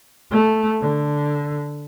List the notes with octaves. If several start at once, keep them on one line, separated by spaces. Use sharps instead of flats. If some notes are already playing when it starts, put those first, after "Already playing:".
A3
D3